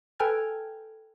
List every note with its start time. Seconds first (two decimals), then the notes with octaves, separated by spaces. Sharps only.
0.19 A4 B4 G5 G#5 F6 G#6